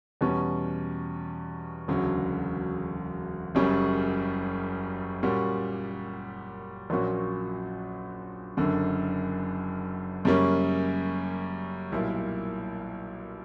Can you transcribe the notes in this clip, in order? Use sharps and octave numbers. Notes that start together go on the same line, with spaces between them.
E2 B2 G3 C#4
E1 D2 C#3 F#3
F#1 F#2 C#3 G3 C#4
A#2 G3 C#4 F#4
A#1 A#2 F#3 C#4 F#4
F#1 F#2 D3
F#2 C#3 G3 A#3 C#4
B1 A#2 G3 A#3 E4